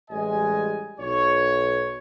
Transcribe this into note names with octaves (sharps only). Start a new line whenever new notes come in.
A1 G3 G#3 D#5 G#5
B1 C#5